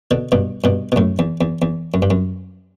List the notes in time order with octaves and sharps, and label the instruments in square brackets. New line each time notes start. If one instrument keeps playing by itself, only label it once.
[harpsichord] B2 D3
G2 B2
G2 B2
B2
F#2 A2
E2
E2
E2
F#2
G2
F#2